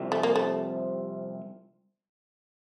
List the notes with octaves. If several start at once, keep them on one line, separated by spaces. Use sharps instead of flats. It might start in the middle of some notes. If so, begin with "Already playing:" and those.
Already playing: C2 C3 F3
A3
A#3
A3